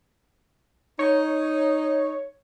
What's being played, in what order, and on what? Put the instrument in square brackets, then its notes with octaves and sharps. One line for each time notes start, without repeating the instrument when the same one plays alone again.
[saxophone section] D#4 [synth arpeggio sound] C#5